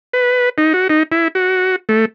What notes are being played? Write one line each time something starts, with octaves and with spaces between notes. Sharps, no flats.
B4
D#4
F#4
D#4
E4
F#4
A3